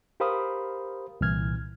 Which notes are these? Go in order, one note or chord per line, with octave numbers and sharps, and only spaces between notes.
G4 A#4 C5 F5 B5 D#6
C2 A#2 E3 F6 G#6